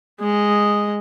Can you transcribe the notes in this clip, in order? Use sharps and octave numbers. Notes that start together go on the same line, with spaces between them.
G#3 D#5